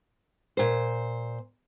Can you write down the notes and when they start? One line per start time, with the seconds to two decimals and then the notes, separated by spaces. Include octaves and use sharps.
0.57 A#2 C5